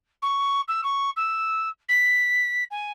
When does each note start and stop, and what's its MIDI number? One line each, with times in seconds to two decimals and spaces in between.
0.22 0.61 85
0.68 0.81 88
0.84 1.10 85
1.16 1.69 88
1.89 2.64 95
2.71 2.92 80